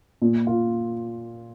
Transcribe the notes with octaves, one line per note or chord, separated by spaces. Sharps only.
A#2
F4